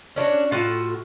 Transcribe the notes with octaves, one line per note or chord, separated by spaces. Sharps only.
C#4 D4 F4 F#4
A2 F4 F#4 A5